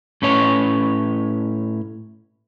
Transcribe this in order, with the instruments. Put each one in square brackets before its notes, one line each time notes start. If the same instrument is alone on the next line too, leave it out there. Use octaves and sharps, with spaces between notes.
[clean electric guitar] A2 C#4 B4 C#5